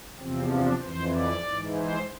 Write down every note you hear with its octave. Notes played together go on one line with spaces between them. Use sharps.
E2 C3 F3 C4
D4
F2 E3 C5
D5
G#2 E3
C5